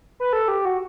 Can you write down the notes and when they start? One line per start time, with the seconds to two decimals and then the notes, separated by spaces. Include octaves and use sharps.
0.20 B4
0.33 A4
0.48 G4
0.65 F#4